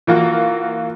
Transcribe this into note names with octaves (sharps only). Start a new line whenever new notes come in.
E3 A#3 F4 F#4